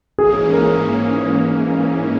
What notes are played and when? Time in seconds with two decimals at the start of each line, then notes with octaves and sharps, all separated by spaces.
0.18 G#2 E3 A#3 C#4 G#4
0.53 A#4